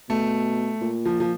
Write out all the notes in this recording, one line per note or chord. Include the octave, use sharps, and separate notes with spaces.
B2 A3
A#2
F3
F3